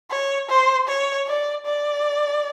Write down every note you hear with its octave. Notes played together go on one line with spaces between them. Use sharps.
C#5
C5
C#5
D5
D5